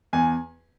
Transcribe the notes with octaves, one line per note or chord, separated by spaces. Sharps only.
E2 G#5